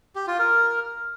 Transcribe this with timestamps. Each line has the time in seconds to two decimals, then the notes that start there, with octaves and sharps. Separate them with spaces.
0.16 G4
0.27 F4
0.39 A#4